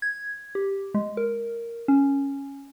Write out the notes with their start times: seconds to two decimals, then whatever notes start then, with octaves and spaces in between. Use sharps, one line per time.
0.02 G#6
0.55 G4
0.94 G#3
1.17 A#4
1.88 C#4